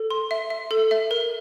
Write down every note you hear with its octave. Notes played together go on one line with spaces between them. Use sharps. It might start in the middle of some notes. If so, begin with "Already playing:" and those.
Already playing: A4
C6
E5
E5
A4
E5
A#4